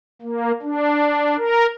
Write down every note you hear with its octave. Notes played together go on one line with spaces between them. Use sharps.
A#3
D4
A#4